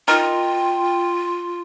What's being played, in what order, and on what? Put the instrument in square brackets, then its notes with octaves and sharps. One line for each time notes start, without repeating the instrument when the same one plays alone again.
[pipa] D#4 A#4 [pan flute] F4 [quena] G5